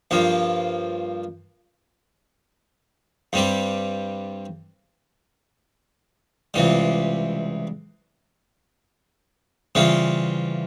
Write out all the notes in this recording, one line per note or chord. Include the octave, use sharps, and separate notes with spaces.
G2 F3 A#3
G2 G3 C4 G4
C#2 C3 E3 G3
C#3 E3 G3 C4 F4